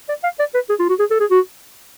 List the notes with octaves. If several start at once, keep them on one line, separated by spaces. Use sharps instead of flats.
D5
F5
D5
B4
G#4
F4
F#4
G#4
A4
G#4
F#4